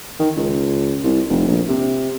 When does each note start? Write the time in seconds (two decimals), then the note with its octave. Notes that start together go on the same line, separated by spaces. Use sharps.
0.20 D#3
0.36 C#2
1.04 C2
1.29 F1
1.48 A#1
1.68 C3